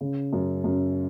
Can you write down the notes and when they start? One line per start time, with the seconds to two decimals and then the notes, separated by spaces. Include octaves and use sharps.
0.01 C#3
0.33 F#2
0.64 F#2